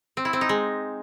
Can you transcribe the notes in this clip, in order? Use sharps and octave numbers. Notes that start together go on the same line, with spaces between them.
C4
E4
C4
D#4
G#3